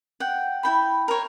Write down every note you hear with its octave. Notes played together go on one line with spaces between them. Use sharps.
F#5 G5
E4 G5 B5
A#4 C5 C#5